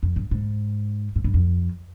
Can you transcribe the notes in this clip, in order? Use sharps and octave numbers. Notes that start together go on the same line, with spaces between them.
F2
G2
G#2
G#2
G2
F2